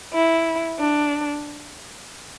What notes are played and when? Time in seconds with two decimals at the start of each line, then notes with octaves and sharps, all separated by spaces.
0.13 E4
0.79 D4